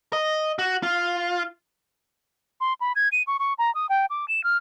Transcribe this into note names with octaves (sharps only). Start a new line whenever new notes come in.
D#5
F#4
F4
C6
B5
G#6
D#7
C#6
C#6
A#5
D#6
G5
D6
E7
F6